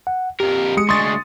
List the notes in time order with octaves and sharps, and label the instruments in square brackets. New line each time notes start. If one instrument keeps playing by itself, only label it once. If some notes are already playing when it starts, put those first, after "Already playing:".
[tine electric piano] F#5
[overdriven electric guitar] F2 A#4 [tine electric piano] G4
[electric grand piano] G#3 D#6 C#7
[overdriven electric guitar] D2 G#3 [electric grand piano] C6 D#6 A6 [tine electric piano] C#6